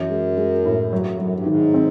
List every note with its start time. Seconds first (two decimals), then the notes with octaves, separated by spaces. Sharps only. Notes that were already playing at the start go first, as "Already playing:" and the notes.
Already playing: F#2 E3
0.10 G#3
0.37 G#3
0.65 A2
0.92 G2 F#3
1.05 F#2
1.19 F#2 F#3
1.33 G2
1.46 G#2 D#3
1.74 C4